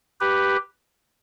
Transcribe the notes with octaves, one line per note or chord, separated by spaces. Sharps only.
G4 B4